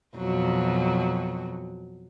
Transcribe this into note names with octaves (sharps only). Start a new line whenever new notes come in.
F2 B2 F#3